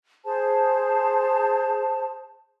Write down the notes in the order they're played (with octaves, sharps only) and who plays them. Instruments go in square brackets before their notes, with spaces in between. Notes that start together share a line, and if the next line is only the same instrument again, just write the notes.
[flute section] G#4 C5 A5